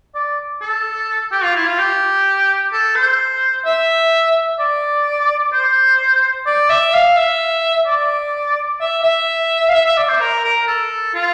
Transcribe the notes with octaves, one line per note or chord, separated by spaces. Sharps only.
D5
A4
G4
F4
E4
F4
G4
A4
C5
E5
D5
C5
D5
E5
F5
E5
D5
E5
E5
F5
E5
E5
D5
C5
A#4
A#4
A4
F4